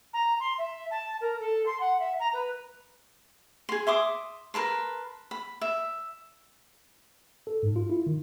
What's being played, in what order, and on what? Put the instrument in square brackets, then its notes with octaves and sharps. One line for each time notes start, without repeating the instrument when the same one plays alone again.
[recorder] A#5
C6
E5
A5
A#4
A4
C6
F#5
E5
A#5
B4
[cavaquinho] G#4 C6
E5 C6 D6 D#6
A#4 B4 A5 C6
B5
E5
[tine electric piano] A4
G#2
F4
E4
D#3